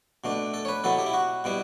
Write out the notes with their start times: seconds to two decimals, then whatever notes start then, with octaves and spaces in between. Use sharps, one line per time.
0.24 B2 A3 D4
0.54 A4
0.65 C#5
0.68 B4
0.84 B2 F#3 B3 E4 A4
0.99 G4
1.06 E4
1.13 F#4
1.44 B2 G3 B3 E4